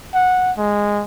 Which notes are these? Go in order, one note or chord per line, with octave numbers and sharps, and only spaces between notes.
F#5
G#3